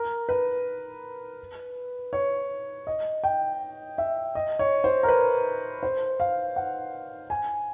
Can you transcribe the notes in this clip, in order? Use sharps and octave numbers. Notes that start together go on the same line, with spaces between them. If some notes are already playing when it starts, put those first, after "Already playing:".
Already playing: A#4
B4
C#5
D#5
G5
E5
D#5
C#5
C5
A#4
B4
C5
F5
F#5
G#5